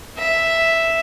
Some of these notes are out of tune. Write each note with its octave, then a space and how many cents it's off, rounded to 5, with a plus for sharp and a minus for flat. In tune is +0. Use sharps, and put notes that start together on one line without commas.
E5 +0